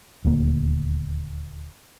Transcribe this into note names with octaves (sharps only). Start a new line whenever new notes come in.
D#1 D2 A#3